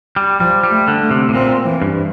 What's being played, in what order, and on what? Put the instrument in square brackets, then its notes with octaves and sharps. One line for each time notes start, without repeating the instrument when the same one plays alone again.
[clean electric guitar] G3
[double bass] F3 [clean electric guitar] G3
[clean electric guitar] G3
[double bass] A3
[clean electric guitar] D3
[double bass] A3
[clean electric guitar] C3
A2
[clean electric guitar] A#2 [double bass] C4
[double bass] E3
[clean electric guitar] G2